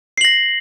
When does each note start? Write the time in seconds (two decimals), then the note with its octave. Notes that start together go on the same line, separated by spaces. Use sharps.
0.18 C7
0.21 F#7
0.25 A#6